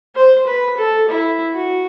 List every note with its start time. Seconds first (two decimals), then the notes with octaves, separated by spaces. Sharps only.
0.16 C5
0.47 B4
0.77 A4
1.09 E4
1.55 F#4